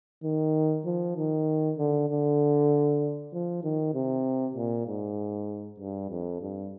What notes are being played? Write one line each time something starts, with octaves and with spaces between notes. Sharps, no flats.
D#3
F3
D#3
D3
D3
F3
D#3
C3
A#2
G#2
G2
F2
G2